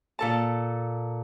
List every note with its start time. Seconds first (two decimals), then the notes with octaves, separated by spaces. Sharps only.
0.19 A#2 A4 A5